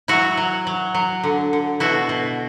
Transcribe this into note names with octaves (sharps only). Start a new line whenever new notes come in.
F#3 E4 F#4
F#3
F#3
F#3
D3
D3
B2 E4 F#4
B2